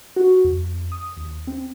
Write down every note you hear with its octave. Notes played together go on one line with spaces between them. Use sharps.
F#4
F2
D#6
D#2
C4